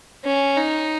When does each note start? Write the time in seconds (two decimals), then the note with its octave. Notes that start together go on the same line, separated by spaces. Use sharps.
0.24 C#4
0.57 D#4